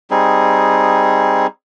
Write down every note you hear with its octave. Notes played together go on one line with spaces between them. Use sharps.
G3 C4 D#4 G#4